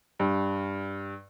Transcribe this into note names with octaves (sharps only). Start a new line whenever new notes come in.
G2